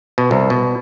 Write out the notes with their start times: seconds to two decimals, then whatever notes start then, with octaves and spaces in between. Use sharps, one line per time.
0.18 B2
0.31 C2
0.50 B2